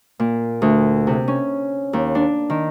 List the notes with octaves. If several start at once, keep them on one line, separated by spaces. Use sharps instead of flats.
A#2
D2
C3
C#4
D#2
D4
D#3